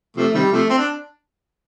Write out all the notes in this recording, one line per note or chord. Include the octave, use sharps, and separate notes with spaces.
C3 F3 A3
C3 D#3 G3
C3 F3 A3
C4
D4